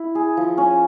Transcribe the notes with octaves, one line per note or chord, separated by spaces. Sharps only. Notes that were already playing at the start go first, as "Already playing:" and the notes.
Already playing: E4
G#4
F3
C#4